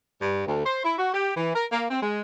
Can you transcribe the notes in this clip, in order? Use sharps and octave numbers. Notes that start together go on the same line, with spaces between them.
G2
D2
C5
E4
F#4
G4
E3
A#4
A#3
C4
G#3